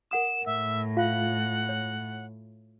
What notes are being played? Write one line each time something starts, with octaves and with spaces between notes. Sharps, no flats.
A#4 F#5 D#6 E7
A2 E5
F4 F5 F#5
C#5